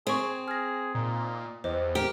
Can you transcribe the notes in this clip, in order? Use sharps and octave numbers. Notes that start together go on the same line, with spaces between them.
C4 G#4 G#5 C#6
G#4 F6 A#6
A#2 D#4
E2 G4 C5 D#5
G4 A#4